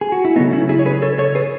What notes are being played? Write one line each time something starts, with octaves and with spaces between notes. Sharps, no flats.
G#4
F#4
E4
C#3 F#3 A3 B3 D#4
C#4 E4
E4 G#4
C#5
G#4 B4
A4 C#5
A4 C#5
G#4 B4